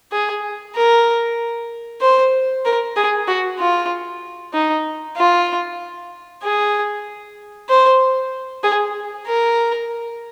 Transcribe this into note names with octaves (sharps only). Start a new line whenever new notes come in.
G#4
A#4
C5
A#4
G#4
F#4
F4
D#4
F4
G#4
C5
G#4
A#4